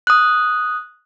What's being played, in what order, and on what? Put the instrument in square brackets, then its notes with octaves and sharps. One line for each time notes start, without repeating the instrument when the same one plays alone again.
[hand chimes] D#6 F#6